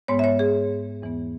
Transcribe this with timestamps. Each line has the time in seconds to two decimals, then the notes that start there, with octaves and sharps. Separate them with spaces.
0.08 G#2 G#3 B3 C#5
0.19 E5
0.24 C#5
0.39 G#4
1.02 E2 E3 B3